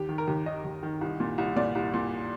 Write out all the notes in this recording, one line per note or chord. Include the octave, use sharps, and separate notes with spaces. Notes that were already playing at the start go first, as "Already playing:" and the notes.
Already playing: D#2 G4
D#3
A#4
D#2
D#3 D#5
D#2
D#3
C2
A#2
C2
A#2 D5
C2
A#2